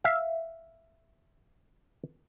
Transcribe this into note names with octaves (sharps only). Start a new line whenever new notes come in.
E5 F5